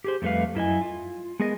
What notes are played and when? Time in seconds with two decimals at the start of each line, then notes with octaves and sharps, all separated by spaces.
0.04 G4 G#4 C5
0.22 F2 G3 A3 C4 B4 F5
0.55 F#2 E4 D#5 G#5
0.81 F4
1.39 G#3 B3 G#4 A#4 D#5